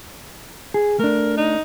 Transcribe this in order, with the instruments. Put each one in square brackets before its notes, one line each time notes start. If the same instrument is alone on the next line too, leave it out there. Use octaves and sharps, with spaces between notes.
[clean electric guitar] G#4
[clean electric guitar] A3 D4 [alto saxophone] A#4
[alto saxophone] D#4